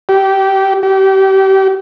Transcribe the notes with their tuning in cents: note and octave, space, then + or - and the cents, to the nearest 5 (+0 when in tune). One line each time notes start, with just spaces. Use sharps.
G4 -20
G4 -30